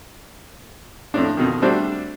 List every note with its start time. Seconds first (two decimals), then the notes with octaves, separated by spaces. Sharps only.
1.14 F2 A2 D4
1.37 F2 B2 D#3
1.62 G3 A3 C4 D4 F#4 C5